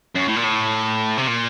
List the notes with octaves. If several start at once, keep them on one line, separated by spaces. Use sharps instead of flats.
F#2
A2
A#2
A2
C3
A#2